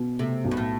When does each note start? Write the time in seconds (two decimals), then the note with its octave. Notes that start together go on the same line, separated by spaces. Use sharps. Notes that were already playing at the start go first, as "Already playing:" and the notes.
Already playing: B2
0.19 C3 A3
0.45 B1
0.51 G2
0.57 A2